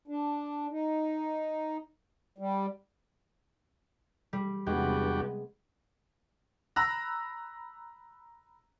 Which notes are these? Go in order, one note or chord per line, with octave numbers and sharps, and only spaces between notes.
D4
D#4
G3
G3
E2 C3 G3 G#3 B3 D4 F#4 G4
A#5 B5 E6 F#6 A#6